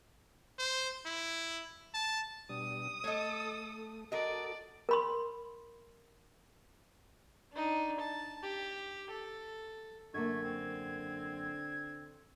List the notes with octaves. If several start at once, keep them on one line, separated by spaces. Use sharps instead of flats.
C5
E4
A5
B2 G3 D4 D#6
A3 A4 C#5 D#5
F#4 A4 A#4 D5 D#5
A#4 B5 C6
D4 D#4
A5
G4
A4
F#2 D3 A3 A#3 G#6
C4